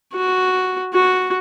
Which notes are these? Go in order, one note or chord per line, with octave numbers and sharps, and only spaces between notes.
F#4
F#4